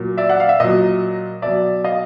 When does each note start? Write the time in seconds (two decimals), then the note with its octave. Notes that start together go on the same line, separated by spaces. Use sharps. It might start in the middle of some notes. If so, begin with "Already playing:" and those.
Already playing: A#2 F#3
0.18 D5 E5
0.30 F#5
0.40 F5
0.49 E5
0.60 A#2 F#3 D#5
1.42 B2 F#3 D5 E5
1.84 D#5 F5